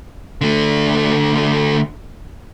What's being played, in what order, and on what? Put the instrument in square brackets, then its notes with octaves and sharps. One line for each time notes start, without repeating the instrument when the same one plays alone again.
[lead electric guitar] D3 A3